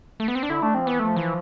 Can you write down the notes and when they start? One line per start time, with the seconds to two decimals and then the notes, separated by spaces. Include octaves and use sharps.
0.20 A3
0.28 B3
0.35 C4
0.43 D4
0.50 D3 E4
0.62 A3 D4
0.74 F3 C4
0.87 E3 B3
0.99 F3 A3
1.16 E3